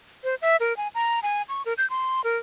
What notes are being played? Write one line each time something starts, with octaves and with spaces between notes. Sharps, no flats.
C5
E5
A#4
G#5
A#5
G#5
C#6
A#4
G6
C6
A#4